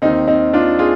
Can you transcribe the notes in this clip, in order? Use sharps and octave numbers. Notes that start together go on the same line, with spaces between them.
D#2 D#3 C4 D#4
C4 D#4
D4 F4
F4 G#4